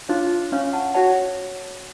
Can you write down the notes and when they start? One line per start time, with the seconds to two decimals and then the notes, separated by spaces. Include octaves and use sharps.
0.09 D4 F4 C#5 F5
0.52 C#4 C#5 F5
0.73 F#5 A5
0.94 F#4 C#5 F#5 A5